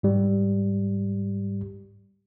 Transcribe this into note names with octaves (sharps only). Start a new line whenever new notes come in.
G#2 G3